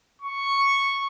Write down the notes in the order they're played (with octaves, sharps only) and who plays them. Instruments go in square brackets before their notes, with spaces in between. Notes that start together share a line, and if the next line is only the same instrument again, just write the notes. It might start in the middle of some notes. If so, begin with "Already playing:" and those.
[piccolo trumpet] C#6